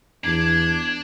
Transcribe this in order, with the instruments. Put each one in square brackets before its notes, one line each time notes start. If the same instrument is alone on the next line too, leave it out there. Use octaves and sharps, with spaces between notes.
[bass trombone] E2 [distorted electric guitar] D4 [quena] G#6